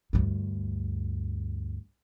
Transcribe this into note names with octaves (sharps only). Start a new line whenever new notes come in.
D2 G2